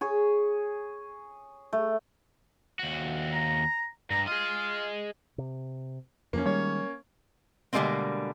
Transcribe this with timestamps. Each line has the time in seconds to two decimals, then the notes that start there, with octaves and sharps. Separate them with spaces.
0.01 G#4 C#5 G#5
1.73 A3
2.79 D#2 F#4
3.33 A#5
4.10 G2 A#5
4.27 F4 G#4 D#5
5.38 C3
6.33 F2 F3 A#3 C#4
6.46 D#3 G3 G#3 C#5
7.73 B2 D3 G3 G#3 A#3 C4